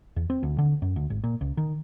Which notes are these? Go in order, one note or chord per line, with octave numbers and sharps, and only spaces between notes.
E2
C4
D2
D3
F#2
D2
G#1
A#2
C#2
D#3